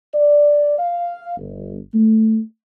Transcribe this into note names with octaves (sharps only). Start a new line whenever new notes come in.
D5
F5
G1
A3